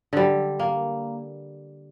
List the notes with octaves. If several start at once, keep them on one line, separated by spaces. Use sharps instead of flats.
D3 G3
A#3